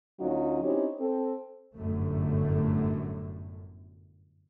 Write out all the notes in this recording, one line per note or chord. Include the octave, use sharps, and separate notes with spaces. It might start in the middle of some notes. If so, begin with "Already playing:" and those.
D2 F#3 C#4 D#4 F4 F#4
C4 C#4 D#4 E4 G4 C#5
C4 A4
G1 F#2 A2 D3 A3